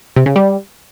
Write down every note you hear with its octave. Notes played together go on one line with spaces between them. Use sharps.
C3
C#3
G3